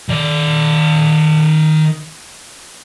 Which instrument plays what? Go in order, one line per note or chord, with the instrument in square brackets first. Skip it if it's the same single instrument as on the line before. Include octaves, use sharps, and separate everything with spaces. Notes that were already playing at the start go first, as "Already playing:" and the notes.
[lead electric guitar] D#3 D5